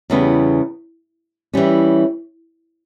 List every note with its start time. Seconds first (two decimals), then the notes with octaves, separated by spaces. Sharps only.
0.10 E2 C#3 G3 B3
1.53 E3 G3 C#4